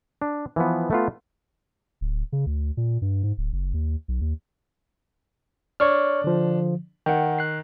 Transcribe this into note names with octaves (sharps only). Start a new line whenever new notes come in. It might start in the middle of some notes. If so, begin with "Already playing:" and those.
D4
E3 F3 B3
A3 B3 F4
D1
C#3
D2
A#2
G2
G#2
D1
F#1
D#2
B1
D#2
D4 C#5 C#6 F6
D3 F3
D#3 F#5 G5
F#6 C7